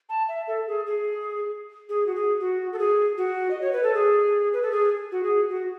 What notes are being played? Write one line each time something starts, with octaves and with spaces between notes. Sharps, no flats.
A5
E5
A4
G#4
G#4
G#4
F#4
G#4
F#4
A4
G#4
F#4
D#5
C#5
B4
A4
G#4
B4
A4
G#4
F#4
G#4
F#4